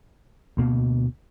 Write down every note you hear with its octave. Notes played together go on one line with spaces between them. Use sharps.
D2 B2 A#3